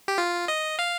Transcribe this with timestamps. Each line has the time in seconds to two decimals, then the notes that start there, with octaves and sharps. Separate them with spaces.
0.08 G4
0.18 F4
0.48 D#5
0.79 F5